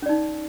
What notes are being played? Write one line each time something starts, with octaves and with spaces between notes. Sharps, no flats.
C#4 D#4 D5